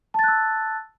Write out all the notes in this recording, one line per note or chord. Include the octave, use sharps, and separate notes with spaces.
A5 E6 F#6 A6